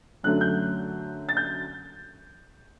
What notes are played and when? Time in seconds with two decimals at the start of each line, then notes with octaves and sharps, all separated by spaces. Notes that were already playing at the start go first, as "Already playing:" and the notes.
0.23 F#2 D3 F#3 A3 F#6
0.41 G6
1.29 A6
1.37 G6